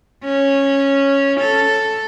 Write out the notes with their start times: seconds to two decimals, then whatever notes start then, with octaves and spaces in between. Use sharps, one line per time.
0.24 C#4
1.40 A4